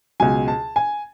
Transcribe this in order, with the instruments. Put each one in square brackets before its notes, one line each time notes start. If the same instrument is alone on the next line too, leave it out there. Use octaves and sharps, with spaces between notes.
[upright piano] C#2 B2 F#3 G#5
A5
G#5